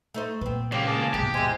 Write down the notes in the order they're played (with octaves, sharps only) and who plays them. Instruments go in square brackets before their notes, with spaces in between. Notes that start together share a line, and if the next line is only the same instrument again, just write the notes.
[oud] A3 D#4 C5
[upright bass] A#2 [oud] B3 C4
[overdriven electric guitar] C#2 A#3 [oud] C#4 [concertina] G4
[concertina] G#4 A5 D6
[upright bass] D#2 B2 [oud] G#2 [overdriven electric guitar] G4
[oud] G#2 E4 [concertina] G#3 C5 G#5